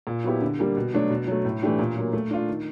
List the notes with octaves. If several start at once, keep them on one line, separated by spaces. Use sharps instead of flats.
A#2
F#3 B3 E4 G4
D3
G3 A#3
B2
F#3 A3 D4
B2
F#3 A3
A2
E3 A3 D4 G4
A#2
F#3 A#3
A3
D4 F4
D#3